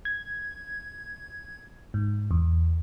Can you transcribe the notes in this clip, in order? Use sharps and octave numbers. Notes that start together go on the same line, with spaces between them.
G#6
G#2
E2